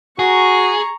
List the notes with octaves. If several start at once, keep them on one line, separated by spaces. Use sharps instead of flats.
F#4 G#4 A#5 C#6